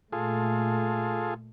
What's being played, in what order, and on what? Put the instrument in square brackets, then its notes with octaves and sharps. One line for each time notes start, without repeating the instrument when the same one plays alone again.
[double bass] A#2 A3 [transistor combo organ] F4 G#4 A4